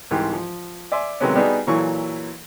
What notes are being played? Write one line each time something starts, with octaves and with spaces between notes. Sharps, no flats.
C2 G#2 E3 G4
F3
D5 E5 G#5 C6
C3 D#3 F#3 G#3 B3 C#4
G3 B3 D4 D#4 F#4 G#4
A#2 E3 F#3 A4 C#6